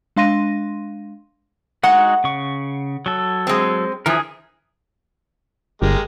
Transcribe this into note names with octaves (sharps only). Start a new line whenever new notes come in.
G#3 D4 F5 C6 A#6 D#7
G#3 D#4 F#4 F#5
C#3 C#6
F#3 A4
G#3 C4
E3 F3 G#4 A#4
G1 G#3 G4 A#4